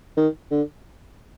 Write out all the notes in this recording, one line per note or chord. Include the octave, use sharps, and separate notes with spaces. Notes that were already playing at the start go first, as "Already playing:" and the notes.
D#3
D3